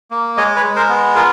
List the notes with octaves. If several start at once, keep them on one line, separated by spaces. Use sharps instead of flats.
A#3
G#3 C#5 D#5
B4 C#5
G#3
A#4 C5
B3
F4 G#4 A#4